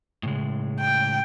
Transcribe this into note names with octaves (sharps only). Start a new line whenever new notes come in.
A2 C#3 G#3
G5